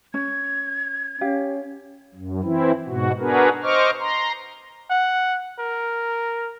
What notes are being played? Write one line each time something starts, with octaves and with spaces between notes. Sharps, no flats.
C#4 G#6
C#4 G4 F5
F#2
E3 C4 E4
G#2 B2 F#4
B3 D4 F#4 G#4 A#4 B4
C5 D#5 C#6 D6 F6
A#5 C6
F#5
A#4